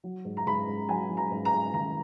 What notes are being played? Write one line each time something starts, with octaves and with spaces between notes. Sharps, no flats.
F#3
G#2
A#5
G#2 B5
G#2
F#3 G#5
F#3
A#5
G#2
A#5
G#2
D#3 A#5